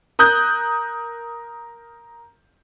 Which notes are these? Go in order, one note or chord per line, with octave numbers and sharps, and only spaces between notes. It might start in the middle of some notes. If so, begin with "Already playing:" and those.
A#4 D#6 F#6 G6